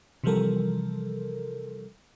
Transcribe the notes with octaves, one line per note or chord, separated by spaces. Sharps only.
C3 E3 F3 G3 A4 A#4